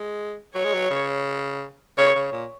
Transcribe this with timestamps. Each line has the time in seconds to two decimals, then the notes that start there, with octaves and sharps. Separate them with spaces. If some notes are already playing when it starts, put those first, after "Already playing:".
Already playing: G#3
0.55 F#3 C#5
0.65 G#3
0.73 F#3
0.90 C#3
1.97 C#3 C#5
2.15 C#3
2.32 A#2